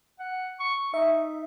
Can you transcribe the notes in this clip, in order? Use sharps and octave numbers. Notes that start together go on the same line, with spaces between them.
F#5
C#6
D#4 E5